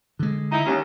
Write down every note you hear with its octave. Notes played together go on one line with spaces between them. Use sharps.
D3 G#3
D#4 E4
D#2 C#4